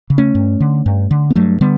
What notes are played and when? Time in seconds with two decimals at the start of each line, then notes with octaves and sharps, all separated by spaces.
0.10 C#3
0.18 A3 C#4
0.35 G2
0.60 D3
0.86 G2
1.11 D3
1.30 B3
1.35 G2 F#3 A3
1.61 D3 G3 B3